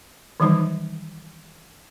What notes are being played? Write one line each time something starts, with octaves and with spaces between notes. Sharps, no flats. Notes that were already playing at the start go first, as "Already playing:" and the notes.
D#3 E3 F#3 G3 D#4 C5